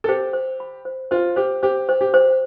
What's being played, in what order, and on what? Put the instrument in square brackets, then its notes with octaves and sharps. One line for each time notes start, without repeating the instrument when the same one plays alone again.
[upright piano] A4
[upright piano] G4 [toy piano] C5
[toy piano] C5
B5
C5
[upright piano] F4 [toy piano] C5
[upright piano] G4 [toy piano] C5
[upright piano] G4 [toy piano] C5
[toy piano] C5
[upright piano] G4
[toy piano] C5